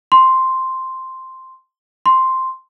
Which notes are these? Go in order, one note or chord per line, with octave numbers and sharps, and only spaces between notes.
C6
C6